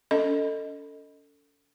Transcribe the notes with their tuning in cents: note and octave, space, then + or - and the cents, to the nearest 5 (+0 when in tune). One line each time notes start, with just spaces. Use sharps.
C#4 +40 A4 +20 D#5 +0